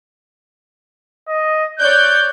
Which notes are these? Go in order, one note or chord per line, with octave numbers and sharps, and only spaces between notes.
D#5
C#5 D5 F#6 G6